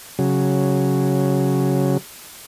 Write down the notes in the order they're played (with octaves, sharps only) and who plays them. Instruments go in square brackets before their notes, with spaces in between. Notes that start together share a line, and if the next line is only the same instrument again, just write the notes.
[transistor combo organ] C#3 F#3